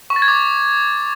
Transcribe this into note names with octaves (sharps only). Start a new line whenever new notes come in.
C#6
A6
G#6
D6